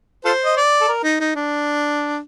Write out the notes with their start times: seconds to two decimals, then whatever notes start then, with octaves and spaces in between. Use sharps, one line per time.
0.25 F4 A4 C5
0.45 D#5
0.57 D5
0.81 A4
0.89 A#4
1.04 D#4
1.20 D#4
1.36 D4